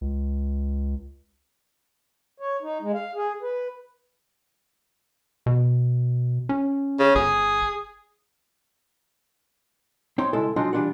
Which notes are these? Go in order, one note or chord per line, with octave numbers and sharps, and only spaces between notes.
C#2
C#5
D#4
G#3
F5
G#4
B4
B2
C#4
C#3
G1 G#4
C4 D#4 C#5 G5 C6
C#3 G#3 E4 A4 A5
F#3 G#3 D4 D#4 F4 F#4
E3 G3 D4 F4 F#5